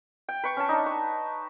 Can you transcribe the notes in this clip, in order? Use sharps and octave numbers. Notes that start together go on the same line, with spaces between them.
G5
B4 C#6
C#4 A5
D4 D#4
C#6